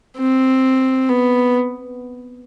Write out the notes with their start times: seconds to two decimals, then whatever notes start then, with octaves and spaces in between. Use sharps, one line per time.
0.17 C4
1.09 B3